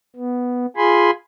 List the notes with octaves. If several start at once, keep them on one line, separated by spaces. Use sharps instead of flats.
B3
F4 G#4 G#5 B5 C6